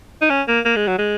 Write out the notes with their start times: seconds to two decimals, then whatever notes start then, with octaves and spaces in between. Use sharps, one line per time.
0.22 D#4
0.30 C#4
0.48 A#3
0.65 A#3
0.76 G#3
0.87 F#3
0.98 G#3